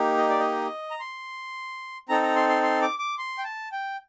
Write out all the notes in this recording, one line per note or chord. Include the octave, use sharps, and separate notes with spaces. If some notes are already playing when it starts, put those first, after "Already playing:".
Already playing: A#3 D#4 G4
D#5
D5
D#5
A#5
C6
C4 D#4 A4 A#5
A#5
C6
C6
C6
D6
D6
C6
G5
A5
G5